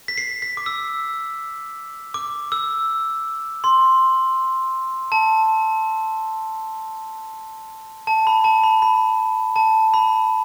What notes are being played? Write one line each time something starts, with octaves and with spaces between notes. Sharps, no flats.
B6
C7
B6
D6
E6
D6
E6
C6
A5
A5
B5
A5
B5
B5
A5
B5